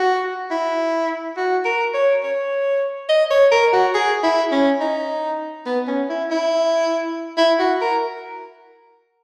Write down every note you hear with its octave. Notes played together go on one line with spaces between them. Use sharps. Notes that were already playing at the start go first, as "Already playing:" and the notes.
Already playing: F#4
E4
F#4
A#4
C#5
C#5
D#5
C#5
A#4
F#4
G#4
E4
C#4
D#4
B3
C#4
E4
E4
E4
F#4
A#4